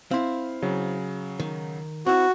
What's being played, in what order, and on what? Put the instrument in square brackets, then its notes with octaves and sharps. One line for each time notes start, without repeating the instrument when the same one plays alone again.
[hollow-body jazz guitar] C4 E4 [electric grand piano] F5 C6
[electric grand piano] C#3 F#3
[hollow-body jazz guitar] D#3
[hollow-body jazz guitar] C4 E4 [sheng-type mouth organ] F#4 [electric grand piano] C#6